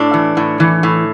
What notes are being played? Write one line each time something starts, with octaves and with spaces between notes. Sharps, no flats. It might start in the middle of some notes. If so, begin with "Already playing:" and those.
Already playing: A2 D4
E3
A2
E3
A2